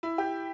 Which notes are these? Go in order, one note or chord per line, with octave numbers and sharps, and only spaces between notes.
E4
G4